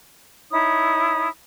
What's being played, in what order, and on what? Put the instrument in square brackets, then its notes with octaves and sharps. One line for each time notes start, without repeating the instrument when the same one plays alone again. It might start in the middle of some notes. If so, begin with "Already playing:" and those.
[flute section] D#4 E4 C#5 D#6